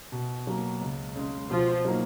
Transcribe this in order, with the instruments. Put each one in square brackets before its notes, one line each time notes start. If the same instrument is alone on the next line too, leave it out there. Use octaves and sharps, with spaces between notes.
[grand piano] B2
F#3 A#3
C#2
C#3 G#3
[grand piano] B2 [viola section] F3 F4
[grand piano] F#3 A#3 D#4